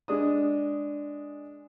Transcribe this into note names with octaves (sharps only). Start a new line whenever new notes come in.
G#3 D4 D#6